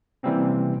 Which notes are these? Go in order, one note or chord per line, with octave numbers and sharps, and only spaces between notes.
C3 E3 G3 A#3 C4 C#4